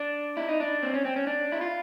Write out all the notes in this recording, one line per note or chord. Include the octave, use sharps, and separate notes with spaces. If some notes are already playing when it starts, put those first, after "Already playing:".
Already playing: D4
E4
D#4
D4
C4
C#4
C4
C#4
D4
E4
F4